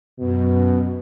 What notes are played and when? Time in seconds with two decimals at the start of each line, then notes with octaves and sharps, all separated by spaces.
0.19 F#2 B2